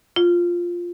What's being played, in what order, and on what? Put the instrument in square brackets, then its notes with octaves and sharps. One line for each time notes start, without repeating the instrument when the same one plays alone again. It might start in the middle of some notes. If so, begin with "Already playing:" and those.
[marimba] F4